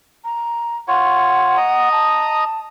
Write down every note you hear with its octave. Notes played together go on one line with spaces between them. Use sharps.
A#5
F4 C#5 F#5
D#5 A#5 D#6
A5